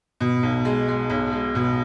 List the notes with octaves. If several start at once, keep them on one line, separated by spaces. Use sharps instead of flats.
B2
B1
G#3
G#3
B1
G#3
B2